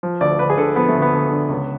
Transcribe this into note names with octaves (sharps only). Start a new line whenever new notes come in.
F3
D2 D5
D2 B4
G#4
D3 A4
F3 B3
A3
D2
B3
D2
D3
C#2